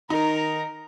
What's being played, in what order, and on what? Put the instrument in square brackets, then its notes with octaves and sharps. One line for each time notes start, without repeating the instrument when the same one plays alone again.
[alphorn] D#3 [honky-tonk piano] D#4 [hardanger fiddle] A#4 [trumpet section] A#5